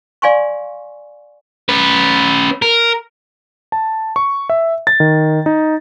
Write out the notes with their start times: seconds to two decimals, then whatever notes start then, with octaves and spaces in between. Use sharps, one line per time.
0.22 D5 F5 G#5 C6 C#6
1.69 C#4 B4
2.62 A#4
3.72 A5
4.16 C#6
4.49 E5
4.87 A6
5.00 D#3
5.46 D#4